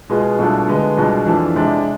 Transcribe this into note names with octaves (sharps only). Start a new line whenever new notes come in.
B2 G#3 B3 F4 G#4
C2 B2 A3 D4 F4
D3 G#3 B3
C2 B2 G#3 D4 F4
F2 E3 A3 D4 F4
C3 G#3 D4